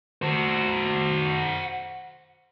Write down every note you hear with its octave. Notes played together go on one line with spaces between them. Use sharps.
F#4 C5